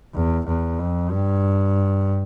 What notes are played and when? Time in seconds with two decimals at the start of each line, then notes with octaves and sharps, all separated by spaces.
0.14 E2
0.47 E2
0.79 F2
1.11 G2